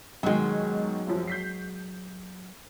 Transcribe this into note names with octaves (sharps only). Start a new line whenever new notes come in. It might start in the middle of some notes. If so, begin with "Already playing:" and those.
G#2 B2 D#3 F#3 G#3
C2 F#2 F3
G6 B6 C7